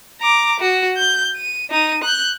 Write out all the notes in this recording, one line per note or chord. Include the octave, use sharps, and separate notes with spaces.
A#5 D6
F#4
G6
D#7
D#4 D#7
F#6 G6